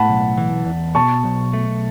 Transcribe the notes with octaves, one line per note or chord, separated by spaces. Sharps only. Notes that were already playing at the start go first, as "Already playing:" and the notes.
Already playing: A2 F#5 A5 B5
B1
E3
E2
B2 A5 C#6
B1
A3